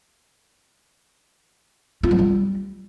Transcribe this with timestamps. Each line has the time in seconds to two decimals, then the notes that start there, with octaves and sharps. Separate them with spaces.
2.03 F4
2.11 F#3
2.19 G3